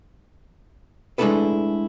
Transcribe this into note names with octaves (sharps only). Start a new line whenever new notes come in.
G#3 A3 D4 E4 A4 B4